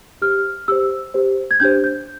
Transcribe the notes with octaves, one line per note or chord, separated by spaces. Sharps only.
G4 C5 F6
G4 C5 E6
G4 C5
G#6
D4 G4 C5 G6
G6